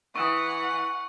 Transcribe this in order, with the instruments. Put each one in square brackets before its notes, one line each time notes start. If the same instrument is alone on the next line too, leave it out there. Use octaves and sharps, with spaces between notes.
[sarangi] E3 [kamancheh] F#5 [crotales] C#6 [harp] D#6 E6 D7